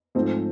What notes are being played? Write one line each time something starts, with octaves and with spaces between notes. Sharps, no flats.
G#2 F3 A3 C4